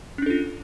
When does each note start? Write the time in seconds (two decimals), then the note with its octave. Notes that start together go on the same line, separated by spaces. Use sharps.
0.18 C#4
0.22 D4
0.26 A4
0.30 F4